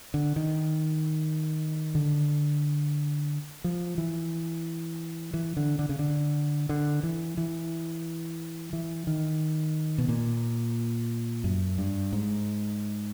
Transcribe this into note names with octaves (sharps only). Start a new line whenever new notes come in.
D3
D#3
D3
F3
E3
E3
D3
D3
C#3
D3
D3
E3
E3
E3
D#3
B2
A#2
F#2
G2
G#2